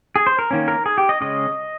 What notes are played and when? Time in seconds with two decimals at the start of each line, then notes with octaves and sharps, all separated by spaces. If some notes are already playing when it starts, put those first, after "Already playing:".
0.16 G#4
0.27 C5
0.39 A#4
0.51 D#3 A#3 C#4
0.68 A#4
0.86 G#4
0.98 G4
1.09 D#5
1.21 C#3 G#3 C#4 D#5